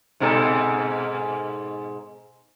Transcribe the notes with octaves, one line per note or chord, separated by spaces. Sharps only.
G#2 B2 A4